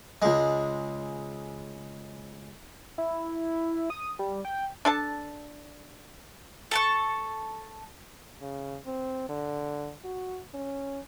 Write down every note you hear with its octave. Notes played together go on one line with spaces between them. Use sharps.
C#2 G#3
E4
D#6
G3
G5
D4 A4 A5
A4 A5 C#6
C#3
C4
D3
F#4
C#4